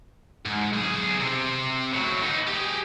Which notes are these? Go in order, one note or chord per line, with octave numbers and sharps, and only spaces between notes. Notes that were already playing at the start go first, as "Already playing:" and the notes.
G#2
B1 G#4
C3 C4
A2 F#3
B3 D#4
G4 G#4